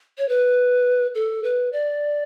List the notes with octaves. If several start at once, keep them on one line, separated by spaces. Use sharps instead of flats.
C#5
B4
A4
B4
D5